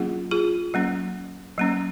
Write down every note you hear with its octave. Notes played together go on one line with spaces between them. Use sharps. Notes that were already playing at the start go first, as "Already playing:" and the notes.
Already playing: F#3 A#3 C#4 F4 G#4
F4 G#4
F#3 A#3 C#4
F#3 A#3 C#4